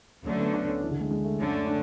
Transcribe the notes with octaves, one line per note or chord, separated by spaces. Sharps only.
D2 D3 F#3 A3 C#4
B3
D4
C#4
E3
D3
G#3
G#3
A3
F#2 D3 A3 C#4
C#4
D4